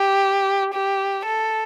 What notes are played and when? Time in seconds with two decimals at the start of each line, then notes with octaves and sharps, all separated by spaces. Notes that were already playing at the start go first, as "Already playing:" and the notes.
Already playing: G4
0.74 G4
1.26 A4